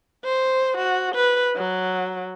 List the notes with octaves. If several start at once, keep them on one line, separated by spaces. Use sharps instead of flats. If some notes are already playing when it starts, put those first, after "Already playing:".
C5
F#4
B4
F#3